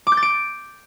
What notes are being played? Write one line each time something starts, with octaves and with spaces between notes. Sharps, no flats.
D6
G6
A6
D7